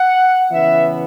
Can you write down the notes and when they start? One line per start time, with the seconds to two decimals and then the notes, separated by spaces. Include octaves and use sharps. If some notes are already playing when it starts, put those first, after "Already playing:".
Already playing: F#5
0.51 C#3 E3 B3 E5